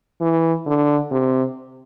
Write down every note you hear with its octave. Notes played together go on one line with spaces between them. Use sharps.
E3
D3
C3